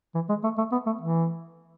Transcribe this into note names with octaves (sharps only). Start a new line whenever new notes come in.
E3
G#3
A3
A3
B3
A3
E3